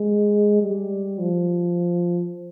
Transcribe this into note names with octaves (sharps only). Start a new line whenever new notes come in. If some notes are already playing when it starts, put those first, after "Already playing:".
Already playing: G#3
G3
F3